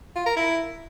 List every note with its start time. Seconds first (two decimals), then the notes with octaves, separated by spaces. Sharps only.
0.16 F4
0.26 A#4
0.37 E4